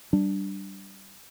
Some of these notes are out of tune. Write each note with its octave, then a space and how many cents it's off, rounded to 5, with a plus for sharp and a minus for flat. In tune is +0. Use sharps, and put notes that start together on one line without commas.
G3 -15 D4 +0